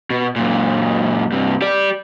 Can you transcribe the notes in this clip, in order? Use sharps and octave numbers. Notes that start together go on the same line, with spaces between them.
B2
F#2 A#2
G2 C3
G4 D5